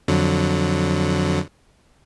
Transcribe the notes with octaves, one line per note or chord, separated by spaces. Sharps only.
F2 D3 F#3